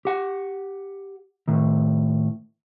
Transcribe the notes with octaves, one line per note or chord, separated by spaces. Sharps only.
G4 F#5
A2 D#3